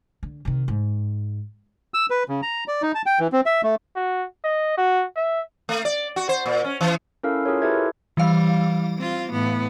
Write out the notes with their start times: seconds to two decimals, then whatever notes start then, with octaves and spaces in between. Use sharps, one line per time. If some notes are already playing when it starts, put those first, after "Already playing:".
0.23 D3
0.45 C3 D#3
0.68 G#2
1.94 E6
2.10 B4
2.29 C#3
2.42 A#5
2.68 D5
2.82 D#4
2.95 A5
3.06 G5
3.19 E3
3.32 C4
3.46 E5
3.63 A3
3.96 F#4
4.44 D#5
4.77 F#4
5.16 E5
5.69 A3
5.85 D5
6.16 F#4
6.29 C5
6.46 A#2
6.64 C#4
6.81 E3
7.23 C#4 E4 A4 A#4 F5
7.45 F4 G#4 A#4 C#5
7.62 E4 G4 A4 B4 E5 G#6
8.17 E3 G3 F5
8.98 C4 F4
9.31 A2 B3